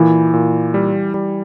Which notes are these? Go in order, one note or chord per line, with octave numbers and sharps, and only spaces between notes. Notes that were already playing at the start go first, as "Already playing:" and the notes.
Already playing: A#2 E3
A#2
G3
G3